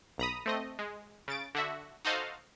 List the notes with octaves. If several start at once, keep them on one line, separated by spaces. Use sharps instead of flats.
B1 A#5 B5 D#6
A3 C4 D#5
G#3
C#3 A6 D7
D3 F#4 E5
D#4 F#4 A4 C5 D#5 F5